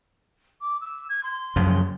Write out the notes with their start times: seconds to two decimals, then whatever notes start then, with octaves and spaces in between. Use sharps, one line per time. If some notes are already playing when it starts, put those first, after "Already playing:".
0.61 D6
0.81 E6
1.09 G#6
1.23 C6
1.56 F#2 C#3 F3